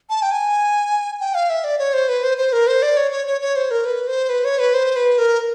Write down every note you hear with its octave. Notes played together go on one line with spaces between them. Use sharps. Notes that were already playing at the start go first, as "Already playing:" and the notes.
A5
G5
G#5
G5
F5
E5
D5
C#5
C5
B4
C5
C5
A#4
C5
D5
C#5
C#5
C#5
C#5
C5
A#4
B4
C5
B4
C#5
B4
C5
B4
A#4